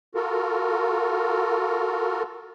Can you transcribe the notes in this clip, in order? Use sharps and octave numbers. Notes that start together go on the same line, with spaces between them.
F4 F#4 A4 A#4